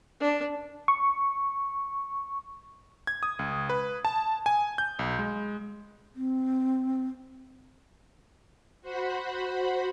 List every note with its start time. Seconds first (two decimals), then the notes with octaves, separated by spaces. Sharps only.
0.20 D4
0.88 C#6
3.07 G#6
3.23 D#6
3.39 C#2
3.69 B4
4.05 A5
4.46 G#5
4.78 G6
4.99 B1
5.19 G#3
6.16 C4
8.82 F#4 C5 F#5 B5